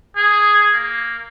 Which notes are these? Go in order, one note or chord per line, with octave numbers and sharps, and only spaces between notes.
G#4
A#3